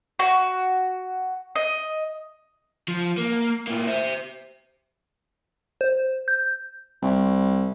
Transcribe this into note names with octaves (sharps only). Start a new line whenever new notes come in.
F#4
D#5
F3
A#3
A2 A#3
C5 E5
C5
G6
C2